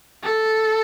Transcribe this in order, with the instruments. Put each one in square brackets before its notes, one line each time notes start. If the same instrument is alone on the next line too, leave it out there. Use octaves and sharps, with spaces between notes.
[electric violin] A4